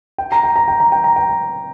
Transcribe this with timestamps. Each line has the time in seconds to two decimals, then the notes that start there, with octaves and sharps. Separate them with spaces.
0.18 G5
0.32 A#5
0.43 G5
0.56 A#5
0.68 G5
0.80 A#5
0.92 G5
1.04 A#5
1.16 G5